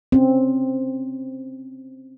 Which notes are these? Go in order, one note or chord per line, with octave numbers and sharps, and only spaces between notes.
C4 C#4